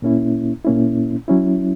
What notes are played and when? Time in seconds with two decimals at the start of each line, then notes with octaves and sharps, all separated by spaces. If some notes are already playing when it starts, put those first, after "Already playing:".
0.02 A#2 A#3 C#4 E4
0.65 A#2 A#3 C#4 E4
1.28 F#3 C#4 E4